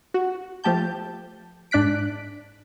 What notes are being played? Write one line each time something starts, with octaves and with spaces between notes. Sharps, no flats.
F#4
F3 A3 G4 A5 G6
G#2 D4 F#6 B6 D7